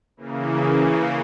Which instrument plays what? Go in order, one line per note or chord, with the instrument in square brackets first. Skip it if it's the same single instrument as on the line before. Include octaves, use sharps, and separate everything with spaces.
[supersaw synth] C#3 E3 A#3